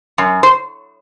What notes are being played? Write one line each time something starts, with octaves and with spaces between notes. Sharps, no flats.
F#2
C5